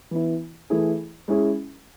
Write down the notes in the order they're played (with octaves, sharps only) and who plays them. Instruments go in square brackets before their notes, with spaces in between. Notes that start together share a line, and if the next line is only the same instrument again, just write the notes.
[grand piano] E3 B3 E4
E3 A3 E4 G#4
G#3 C#4 E4 G#4